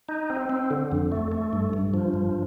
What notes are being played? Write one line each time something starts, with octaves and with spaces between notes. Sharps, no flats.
D#4
C4
C4
D3
F2
A3
A3
G2
G2
F3
G2